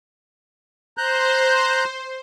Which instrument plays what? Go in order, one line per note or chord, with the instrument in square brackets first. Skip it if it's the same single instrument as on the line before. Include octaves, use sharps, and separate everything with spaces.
[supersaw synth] C5 [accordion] A#5 F#6 G6